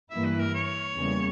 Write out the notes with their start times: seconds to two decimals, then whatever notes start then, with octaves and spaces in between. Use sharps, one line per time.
0.10 G2 E3 A#3 E4 E5
0.25 B4
0.39 A#4
0.54 C#5
0.97 E2 C#3 G3 A#3